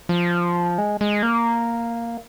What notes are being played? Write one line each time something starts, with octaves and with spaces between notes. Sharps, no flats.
F3
G#3
G#3
A#3